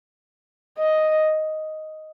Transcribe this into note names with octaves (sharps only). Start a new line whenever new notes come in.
D#5